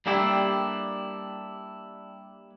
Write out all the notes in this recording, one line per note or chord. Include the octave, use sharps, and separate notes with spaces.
G3 A#3 D4 E4 G4 A4